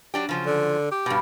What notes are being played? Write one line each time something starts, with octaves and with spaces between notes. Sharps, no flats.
F#3 D4 G4
C#3 F3 F#3
D3
G4
G2 B2